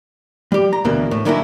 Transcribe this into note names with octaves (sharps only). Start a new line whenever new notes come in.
G3 G4
A#5
D2 B2 E3 A#3
A2
D3 D#3 F#3 A#3 C#4 E4